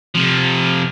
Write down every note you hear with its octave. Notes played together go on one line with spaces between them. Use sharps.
C3 F3